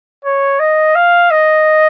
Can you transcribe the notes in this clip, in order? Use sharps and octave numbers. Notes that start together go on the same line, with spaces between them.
C#5
D#5
F5
D#5